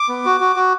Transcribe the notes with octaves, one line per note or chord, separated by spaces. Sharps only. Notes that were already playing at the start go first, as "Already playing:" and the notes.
Already playing: D6
B3
F#4
F#4
F#4